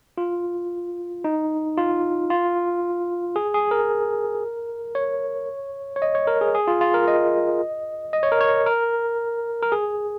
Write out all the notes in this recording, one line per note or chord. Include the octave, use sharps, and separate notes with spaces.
F4
D#4
F4
F4
G#4
G#4
A#4
C#5
C#5
D#5
C#5
A#4
G#4
G#4
F4
F4
A#4
D#5
D#5
C#5
A#4
C#5
A#4
A#4
G#4